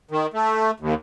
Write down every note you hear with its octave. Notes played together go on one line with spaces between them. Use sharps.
D#3
A3
D#2